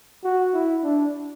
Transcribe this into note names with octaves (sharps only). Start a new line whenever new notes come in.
F#4
E4
D4